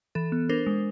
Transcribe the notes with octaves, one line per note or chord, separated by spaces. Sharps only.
E3 A4
B3
D4 A#4 C5
G#3